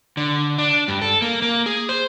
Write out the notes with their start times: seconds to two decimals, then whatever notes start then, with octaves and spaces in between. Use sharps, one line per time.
0.17 D3
0.58 D4
0.88 G2
1.02 A4
1.22 A#3
1.42 A#3
1.66 G#4
1.89 C5